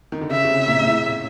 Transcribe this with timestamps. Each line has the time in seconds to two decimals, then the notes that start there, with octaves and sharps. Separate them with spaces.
0.12 D#3
0.21 D3
0.30 C#3 E5
0.45 C#3
0.48 C3
0.67 A#2
0.80 A#2
0.86 A2